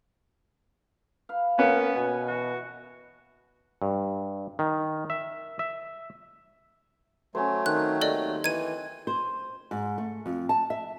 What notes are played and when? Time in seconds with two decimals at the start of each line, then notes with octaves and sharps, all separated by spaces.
1.29 B4 F5
1.59 A#3 B3 C#4
1.96 B2 G#5
2.28 E3 F#4
3.82 G2
4.59 D#3
5.10 E5
5.59 E5
7.35 F#3 A3 C#4 C5
7.66 D#3 C4 C5 A5 F#6
8.01 D#2 A4 D5 D#5
8.44 E3 D#4 G#6 D#7
9.07 C5
9.71 G#2
9.98 A3
10.26 F2
10.49 A5
10.70 E5